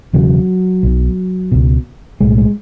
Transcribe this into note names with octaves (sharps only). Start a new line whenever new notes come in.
E1 E2 C#3 F#3
B1 B2
C#2 B2
B1 A2 G#3
G#3